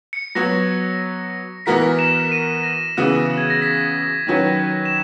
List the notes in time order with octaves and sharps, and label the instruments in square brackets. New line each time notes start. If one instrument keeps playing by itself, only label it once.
[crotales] C#7
[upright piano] F#3 B3 F#4 C#5 [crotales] A#6
[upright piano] E3 B3 F#4 A#4 [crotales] B6
[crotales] E7
D#7
A#6
[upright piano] C#3 E3 B3 F#4
[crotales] G#6
A#6
B6
[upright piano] D#3 F#3 C#4 F#4 B4
[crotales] E7